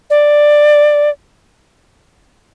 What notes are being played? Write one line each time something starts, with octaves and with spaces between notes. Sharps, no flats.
D5